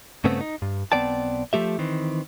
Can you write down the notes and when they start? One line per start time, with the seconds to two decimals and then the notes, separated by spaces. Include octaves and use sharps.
0.24 G2 C#3 A3 B3 C4
0.41 D#4
0.62 G2
0.92 B1 B3 C4 D5 G5 A5
1.53 F3 A3 G4 E5
1.79 D#3 E3 C4